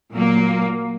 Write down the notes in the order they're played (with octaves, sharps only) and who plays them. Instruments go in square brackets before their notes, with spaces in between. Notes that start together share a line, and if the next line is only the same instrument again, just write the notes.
[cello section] A#2 F#3 A#3